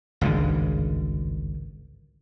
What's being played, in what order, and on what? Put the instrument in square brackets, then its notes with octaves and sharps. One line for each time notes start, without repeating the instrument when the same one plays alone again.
[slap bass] G#1 C#2 G2 D3